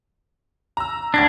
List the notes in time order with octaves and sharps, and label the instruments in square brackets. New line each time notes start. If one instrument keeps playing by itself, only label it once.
[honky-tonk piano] A#5 E6
[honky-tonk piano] D2 G#6 A#6 [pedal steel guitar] D4